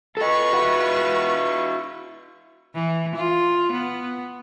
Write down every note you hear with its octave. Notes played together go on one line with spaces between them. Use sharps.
F4 A4 B4 D#5 C#6
E4 F#4
E3
F4
B3